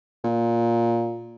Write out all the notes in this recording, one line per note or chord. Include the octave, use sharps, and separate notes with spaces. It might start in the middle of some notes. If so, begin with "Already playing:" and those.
A#2